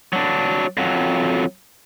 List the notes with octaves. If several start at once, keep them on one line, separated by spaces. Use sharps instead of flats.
F#3 D4
F2 F#3